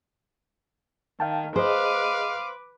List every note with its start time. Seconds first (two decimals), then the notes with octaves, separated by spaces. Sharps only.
1.20 D#3 F5 G5 A5
1.56 G#4 B4 C5 D#5 F5 D6